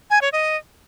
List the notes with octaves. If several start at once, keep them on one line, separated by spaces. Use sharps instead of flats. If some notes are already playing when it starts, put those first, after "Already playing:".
G#5
C#5
D#5